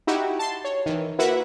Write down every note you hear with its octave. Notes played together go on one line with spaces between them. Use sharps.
D#4 E4 F#4 G4
A5 C6
C#5
D#3 E3
A#3 E4 F#4 B4 E5 F#5